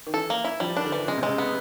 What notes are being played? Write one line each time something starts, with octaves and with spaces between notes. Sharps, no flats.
D#3
E3 A4
A#3
E4
F3 G3
D#3 D4
D3
E3
C#3 G#3
C3
G#3
C#3
B3